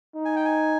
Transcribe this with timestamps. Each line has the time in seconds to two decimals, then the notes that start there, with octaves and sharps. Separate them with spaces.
0.15 D#4
0.25 G#5
0.36 G5
0.45 G#5